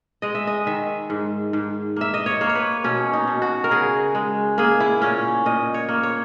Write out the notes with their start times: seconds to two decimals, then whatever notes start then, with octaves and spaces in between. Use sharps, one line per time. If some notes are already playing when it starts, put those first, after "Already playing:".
0.22 G#3 D#5
0.35 E5
0.47 D#5
0.67 D#3 E5
1.10 G#2
1.53 G#2
1.96 A#3 E5
2.14 D#5
2.26 C#5
2.41 A#3
2.49 C#5
2.55 B4
2.84 B2 C#4
3.13 D#4
3.27 B2
3.42 F#4
3.64 A#4
3.71 C#3 G#4
4.15 G#3
4.58 A#3 G#4
4.80 E4
5.02 A#2 C#4
5.46 A#2 D#5
5.74 C#5
5.88 A#3
6.03 C#5